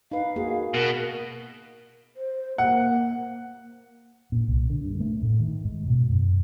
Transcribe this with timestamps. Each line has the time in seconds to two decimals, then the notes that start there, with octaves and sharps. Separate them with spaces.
0.12 D#4 B4 F5
0.36 A#3 F#4 G#4
0.74 B2 A#4
2.16 C5
2.58 A#3 F#5
4.32 A#2
4.48 C2
4.70 D3
4.84 G2
5.00 A3
5.22 A2
5.40 D#3
5.65 G#2
5.88 B2
6.10 F#2